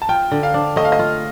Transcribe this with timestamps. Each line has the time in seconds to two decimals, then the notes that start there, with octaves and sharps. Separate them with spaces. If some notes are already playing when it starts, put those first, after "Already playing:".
0.02 A5
0.09 F4 G5
0.31 D3
0.43 F5
0.54 D4
0.76 A3 D#5
0.85 F5
0.92 D#5
0.99 F4